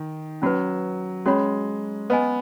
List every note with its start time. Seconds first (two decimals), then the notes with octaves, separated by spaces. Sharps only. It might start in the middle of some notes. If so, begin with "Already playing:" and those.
Already playing: D#3 D#4
0.42 F#3 C#4 F#4 B4
1.26 G#3 C#4 F#4 C#5 B5
2.10 B3 B4 D#5 G#5